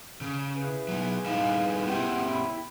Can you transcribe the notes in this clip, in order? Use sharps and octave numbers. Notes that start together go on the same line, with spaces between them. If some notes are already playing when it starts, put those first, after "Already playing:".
C#3
E4 G#4 B4
F#3 B3
G3 D#4 E4 F5
B3 E4 G4 G#4 F#5 G5
B5